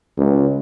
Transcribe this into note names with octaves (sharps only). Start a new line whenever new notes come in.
C#2